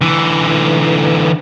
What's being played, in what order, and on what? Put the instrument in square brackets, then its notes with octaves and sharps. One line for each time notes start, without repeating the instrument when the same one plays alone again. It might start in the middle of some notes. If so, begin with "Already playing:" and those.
[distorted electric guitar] D3 E3